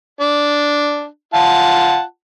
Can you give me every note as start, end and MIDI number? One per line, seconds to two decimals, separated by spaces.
0.21 1.06 62
1.34 2.02 65
1.34 2.02 78
1.34 2.02 81